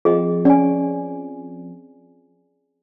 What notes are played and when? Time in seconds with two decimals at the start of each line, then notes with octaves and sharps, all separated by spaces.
0.05 F3 C4 G#4 D#5
0.45 C#4 D5 G#5